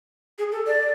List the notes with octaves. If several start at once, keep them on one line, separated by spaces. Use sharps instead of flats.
G#4
A4
D5